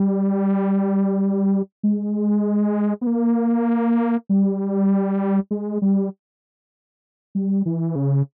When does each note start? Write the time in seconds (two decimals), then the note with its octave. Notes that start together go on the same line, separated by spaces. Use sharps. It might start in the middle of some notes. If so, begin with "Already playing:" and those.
Already playing: G3
1.83 G#3
3.01 B3
3.07 A#3
4.29 G3
5.51 G#3
5.82 G3
7.35 G3
7.66 E3
7.95 C#3